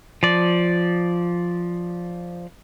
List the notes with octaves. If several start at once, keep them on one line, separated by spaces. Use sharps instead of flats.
F3 D5